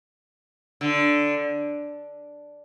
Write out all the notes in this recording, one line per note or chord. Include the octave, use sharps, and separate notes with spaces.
D3